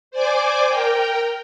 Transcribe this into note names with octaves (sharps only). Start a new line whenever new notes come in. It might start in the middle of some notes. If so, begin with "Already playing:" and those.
C5 D5 G#5 D6
A#4 G5